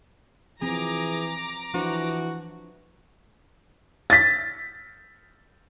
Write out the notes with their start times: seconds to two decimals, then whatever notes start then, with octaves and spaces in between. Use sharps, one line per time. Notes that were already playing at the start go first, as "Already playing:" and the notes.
0.62 E3 F3 C4 G#4 A#5 D6
1.74 E3 F3 D4 F#4 C5
4.10 A6 B6